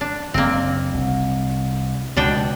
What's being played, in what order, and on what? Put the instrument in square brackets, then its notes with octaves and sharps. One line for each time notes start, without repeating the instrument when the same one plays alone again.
[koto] D4
[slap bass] F#1 [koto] A#3 C4
[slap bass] C2
[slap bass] C#2 [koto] B2 D4 G5